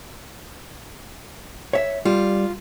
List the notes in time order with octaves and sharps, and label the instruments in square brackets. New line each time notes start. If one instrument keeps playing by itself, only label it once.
[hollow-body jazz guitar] C#5 E5
[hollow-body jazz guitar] G3 [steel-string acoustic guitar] F4